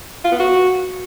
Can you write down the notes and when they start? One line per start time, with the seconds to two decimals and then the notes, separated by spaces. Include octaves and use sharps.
0.24 F4
0.32 B3
0.40 F#4